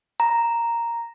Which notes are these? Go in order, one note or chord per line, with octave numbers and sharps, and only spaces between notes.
A#5